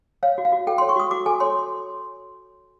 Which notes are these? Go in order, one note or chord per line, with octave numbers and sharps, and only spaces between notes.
C#5 F5
F#4
F5
F#4
A4 G5
C#5 C6
C#6
F#4 D#6
F#4 D6
A4 G#5
C#5 C6